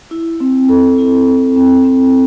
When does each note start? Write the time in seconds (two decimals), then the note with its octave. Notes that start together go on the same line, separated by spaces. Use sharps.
0.11 E4
0.40 C4
0.69 A4
0.98 E4
1.27 C4
1.56 C4
1.85 C4